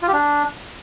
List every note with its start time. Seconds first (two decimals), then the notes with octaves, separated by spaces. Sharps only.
0.02 F4
0.08 G4
0.13 D4